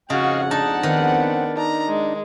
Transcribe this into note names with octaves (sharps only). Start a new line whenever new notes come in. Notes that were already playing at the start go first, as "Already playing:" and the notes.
F2 G#2 C#3 F#4 D#5 F5 F#5
D4 D#4 A5
D#3 B3 C4 D4
D4 D#4 A#5
G#3